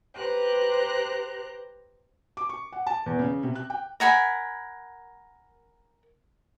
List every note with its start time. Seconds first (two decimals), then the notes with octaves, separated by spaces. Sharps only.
0.17 G4 B4 C5 A#5 F#6
2.37 D6
2.49 C#6
2.72 F#5
2.87 A5
3.06 E2
3.19 C#3
3.43 C3
3.55 F#6
3.70 G5
4.00 A#4 F#5 G#5 B5